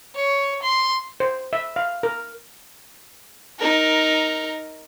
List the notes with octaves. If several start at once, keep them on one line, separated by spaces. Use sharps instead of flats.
C#5
C6
C5
E5
F5
A#4
D#4 A#4